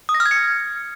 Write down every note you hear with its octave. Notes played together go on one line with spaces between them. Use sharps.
D#6
A#6
F6
G#6
C#7